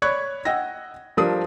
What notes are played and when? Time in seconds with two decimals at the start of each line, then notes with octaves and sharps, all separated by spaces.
0.02 C#5 D5 B5 C#6 F#6 G#6
0.45 D#5 F#5 G5 E6 A#6
1.17 F3 G3 D4 A#4 D#6